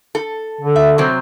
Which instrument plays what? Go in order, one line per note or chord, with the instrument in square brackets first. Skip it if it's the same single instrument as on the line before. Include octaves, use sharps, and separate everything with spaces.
[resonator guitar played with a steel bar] A4
[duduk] D3
[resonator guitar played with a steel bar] E5
C3 F#3 C4